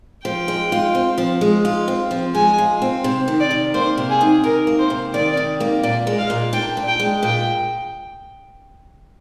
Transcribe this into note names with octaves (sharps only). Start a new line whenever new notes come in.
F3 G5
G#3
F4
C4
F3
G#3
F4
C4
F3
G#3 G#5
F4
C4
C3
D#3
D5
C3
A#3 C5
C3
G#4
D#3
C3 A#4
A#3
C5
C3
D#3 D5
C3
A#3
A#2 D5
G#3
F5
A#2
D4 G5
A#2
G5
G#3
A#2 G5